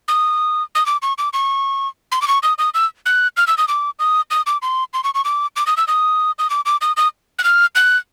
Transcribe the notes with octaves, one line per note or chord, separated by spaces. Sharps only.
D#6
D#6
D6
C#6
D6
C#6
C6
D6
C#6
D#6
D#6
E6
F#6
F6
E6
D#6
D6
D#6
D#6
D6
C6
C6
C#6
C#6
D6
D6
D#6
E6
D#6
D#6
D6
D6
D#6
D#6
F#6
F6
F#6